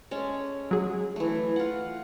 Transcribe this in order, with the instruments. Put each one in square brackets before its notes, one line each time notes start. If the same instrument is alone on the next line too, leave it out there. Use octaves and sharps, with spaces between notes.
[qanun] G#3 C#4 A4
[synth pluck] F#3 G#4
[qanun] E3 A3
F4 F#5